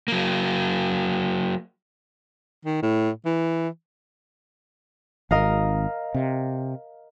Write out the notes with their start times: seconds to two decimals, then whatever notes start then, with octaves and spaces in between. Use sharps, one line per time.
0.08 F#3 A#3
2.65 D#3
2.82 A2
3.25 E3
5.31 G#1 A#4 D#5 F5
6.14 C3